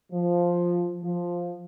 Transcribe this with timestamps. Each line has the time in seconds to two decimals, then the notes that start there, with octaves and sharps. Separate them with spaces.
0.12 F3
1.02 F3